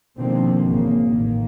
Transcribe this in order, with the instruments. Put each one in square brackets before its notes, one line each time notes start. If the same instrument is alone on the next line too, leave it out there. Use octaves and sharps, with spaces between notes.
[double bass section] B2 D3 D#3 F3 A#3 C4
G#1 E2 C#3 A#3
A1 D#3 A#3